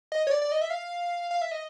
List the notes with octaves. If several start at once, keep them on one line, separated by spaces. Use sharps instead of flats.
D#5
C#5
D5
D5
D#5
E5
F5
F5
E5
D#5